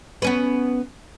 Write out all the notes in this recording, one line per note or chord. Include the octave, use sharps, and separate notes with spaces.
B3 C#4 B4